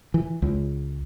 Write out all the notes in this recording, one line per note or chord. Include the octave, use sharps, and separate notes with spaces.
E3
C#2